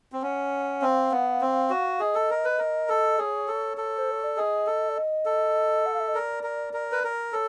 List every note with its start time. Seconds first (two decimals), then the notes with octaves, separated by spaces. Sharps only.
0.12 C4
0.22 C#4 F#5
0.82 C4 F5
1.11 B3
1.41 C4
1.70 F#4
2.00 G#4 D#5
2.15 A4
2.30 A#4
2.45 B4
2.59 A#4
2.89 A4
3.18 G#4 C#5
3.48 A4
3.77 A4
3.97 C5
4.10 C#5
4.23 D5
4.37 G#4 D#5
4.67 A4
4.88 D5
4.96 D#5
5.25 A4
5.85 F#5
5.93 F5
5.99 E5
6.07 D#5
6.14 A#4 D5
6.43 A#4
6.73 A#4
6.92 B4
7.04 A#4
7.33 A4 C#5